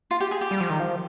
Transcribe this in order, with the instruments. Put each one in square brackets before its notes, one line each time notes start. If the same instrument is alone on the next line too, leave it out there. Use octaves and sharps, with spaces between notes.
[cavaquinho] F4
G4
G#4
G4
[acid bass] G3
F3
D#3
F3